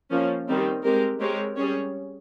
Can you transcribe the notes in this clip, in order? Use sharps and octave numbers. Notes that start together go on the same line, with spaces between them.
F3 A#3 C#4
D#3 G3 C4 D#4
G#3 C4 G4 A#4
G#3 C4 G4 A#4 C#5
G3 C#4 G#4 C#5